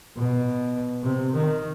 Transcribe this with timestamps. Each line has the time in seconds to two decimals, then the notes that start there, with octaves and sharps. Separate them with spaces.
0.17 B2
1.04 C3
1.34 D#3